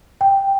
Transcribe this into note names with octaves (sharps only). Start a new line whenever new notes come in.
G5